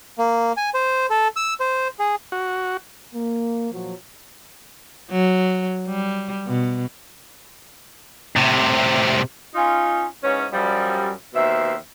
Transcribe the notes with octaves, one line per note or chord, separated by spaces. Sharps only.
A#3
G#5
C5
A4
E6
C5
G#4
F#4
A#3
A#2 F3 F#3
F#3
G3
B2
A2 C3
C#4 D#4 F4
G#2 E3 C#4
F#2 F3 G3
D#2 B2 C5 E5